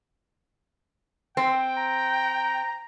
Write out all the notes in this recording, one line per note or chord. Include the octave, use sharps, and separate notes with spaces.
C4 G5
A#5